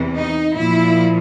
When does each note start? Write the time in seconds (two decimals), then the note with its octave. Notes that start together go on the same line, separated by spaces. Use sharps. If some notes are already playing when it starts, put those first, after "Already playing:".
Already playing: E2 C3 E3
0.17 D#4
0.57 A#2 F3 E4